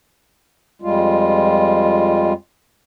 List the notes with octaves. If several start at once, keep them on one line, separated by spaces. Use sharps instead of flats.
F2 G3 G#3 F4